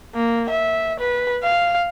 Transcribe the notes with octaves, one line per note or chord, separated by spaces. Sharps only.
A#3
E5
B4
F5